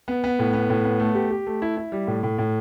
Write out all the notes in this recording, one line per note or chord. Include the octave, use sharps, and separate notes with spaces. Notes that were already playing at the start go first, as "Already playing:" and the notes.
B3
B3
A2
B3
A2
B3
A3
G4
G4
A3
E4
E4
G3
A2
A2
A2